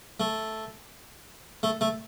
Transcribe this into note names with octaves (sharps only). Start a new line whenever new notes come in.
A3
A3
A3